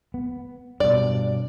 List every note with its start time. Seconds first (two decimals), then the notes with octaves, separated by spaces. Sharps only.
0.14 B3
0.80 G2 B2 D5